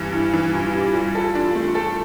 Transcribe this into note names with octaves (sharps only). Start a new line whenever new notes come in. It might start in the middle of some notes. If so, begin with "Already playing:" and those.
Already playing: G2 E3 G3
G2 E4
E3 E4
G2 F4
G2 G4
G3 F4
A4
D4
A3
A4